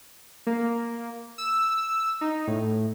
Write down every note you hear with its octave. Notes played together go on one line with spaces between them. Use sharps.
A#3
E6
D#4
A2